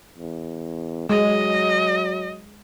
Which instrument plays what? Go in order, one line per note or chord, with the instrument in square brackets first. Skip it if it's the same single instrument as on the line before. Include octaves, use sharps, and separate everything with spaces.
[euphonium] E2
[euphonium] F#3 [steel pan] G#3 [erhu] D#5